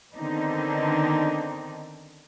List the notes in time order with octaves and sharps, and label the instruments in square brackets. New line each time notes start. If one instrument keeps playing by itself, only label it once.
[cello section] D3 D#3 B3 C4 D4 D#4